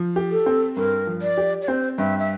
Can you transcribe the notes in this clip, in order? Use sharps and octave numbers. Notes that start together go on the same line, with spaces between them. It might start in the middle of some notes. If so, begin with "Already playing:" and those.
Already playing: F3
G4
A4
C4
G2 A#4
F3
D5
G4
D5
C4 C5
G2 E5
E5